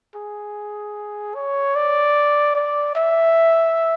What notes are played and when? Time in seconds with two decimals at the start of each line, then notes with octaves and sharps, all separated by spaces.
0.16 G#4
1.35 C#5
1.76 D5
2.55 D5
2.96 E5